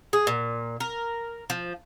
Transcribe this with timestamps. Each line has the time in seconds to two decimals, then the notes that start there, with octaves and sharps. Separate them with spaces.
0.13 G#4
0.27 A#2
0.80 A#4
1.50 F3